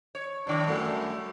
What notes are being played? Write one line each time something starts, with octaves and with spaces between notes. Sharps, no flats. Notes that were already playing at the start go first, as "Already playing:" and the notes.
C#5
G2 D#3 D4
F#2 G3 A3